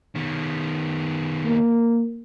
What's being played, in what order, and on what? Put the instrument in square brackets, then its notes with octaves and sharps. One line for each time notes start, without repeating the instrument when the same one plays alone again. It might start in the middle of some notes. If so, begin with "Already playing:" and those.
[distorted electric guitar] D#3 B3
[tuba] A#3